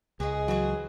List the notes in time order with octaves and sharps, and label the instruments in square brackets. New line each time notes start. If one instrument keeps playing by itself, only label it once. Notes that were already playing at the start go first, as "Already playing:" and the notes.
[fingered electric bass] C#2 [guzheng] G#3 F#4 [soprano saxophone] G#4
[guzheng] E3 C4 F#4 [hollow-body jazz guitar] F#3